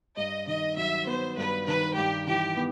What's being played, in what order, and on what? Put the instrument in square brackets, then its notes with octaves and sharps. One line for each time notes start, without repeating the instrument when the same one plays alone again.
[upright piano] G2 [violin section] D#5
[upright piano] D#3 [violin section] D#5
[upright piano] F#3 [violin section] E5
[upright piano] B3 [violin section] C5
[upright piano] G2 [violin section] B4
[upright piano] D#3 [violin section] B4
[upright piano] G2 [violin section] G4
[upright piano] E3 [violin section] G4
[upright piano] B3